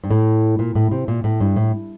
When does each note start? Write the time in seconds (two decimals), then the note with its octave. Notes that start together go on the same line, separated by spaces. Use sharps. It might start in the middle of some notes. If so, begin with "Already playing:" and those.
0.04 G2
0.11 A2
0.59 A#2
0.75 A2
0.91 C3
1.08 A#2
1.24 A2
1.40 G2
1.56 A2